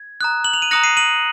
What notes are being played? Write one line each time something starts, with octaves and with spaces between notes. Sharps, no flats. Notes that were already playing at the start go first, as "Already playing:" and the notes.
Already playing: G#6
A#5 D#6 F#6
F#7
F7
D#7
A#5 D#6 F#6 A#6 C#7
C7 D#7
D#7 F#7